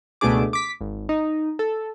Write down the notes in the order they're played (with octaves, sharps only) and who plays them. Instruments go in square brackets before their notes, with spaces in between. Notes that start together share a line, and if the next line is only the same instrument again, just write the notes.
[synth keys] C#2 B2 A3 D4 G#4 D6
D6 B6
G#1
D#4
A4